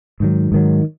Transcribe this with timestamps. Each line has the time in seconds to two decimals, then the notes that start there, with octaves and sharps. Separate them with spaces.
0.20 G#2 D#3 F#3
0.52 G#2 D#3 F#3